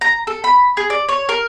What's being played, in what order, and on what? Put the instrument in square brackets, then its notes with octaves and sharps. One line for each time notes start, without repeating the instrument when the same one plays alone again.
[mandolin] A#5
A4
B5
G#4
D5
C#5
A#4